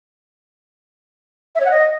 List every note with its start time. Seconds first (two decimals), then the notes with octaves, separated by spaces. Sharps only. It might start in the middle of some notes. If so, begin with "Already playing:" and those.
1.55 E5
1.60 C#5
1.65 F#5
1.71 D#5